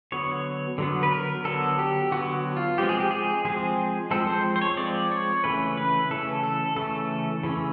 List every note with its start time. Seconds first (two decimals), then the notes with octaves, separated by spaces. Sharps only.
0.12 D3 F#3 B3 C#5
0.78 D3 F#3 B3
1.03 B4
1.12 A#4
1.45 D3 F#3 B3 A4
1.79 G4
2.12 D3 F#3 B3 F#4
2.57 F4
2.78 F3 G#3 C4 G4
2.89 G#4
3.00 G4
3.11 G#4
3.45 F3 G#3 C4 G#4
4.11 F3 G#3 C4 A4
4.27 C5
4.56 C5
4.62 C#5
4.77 F3 G#3 C4 D5
5.11 C#5
5.44 C#3 E3 A3 C#4 B4
5.77 B4
6.10 C#3 E3 A3 C#4 A4
6.44 A4
6.76 C#3 E3 A3 C#4 A4
7.43 C#3 E3 A3 C#4